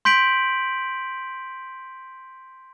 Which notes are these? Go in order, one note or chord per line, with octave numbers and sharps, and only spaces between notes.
C6 G6 B6 D7 F#7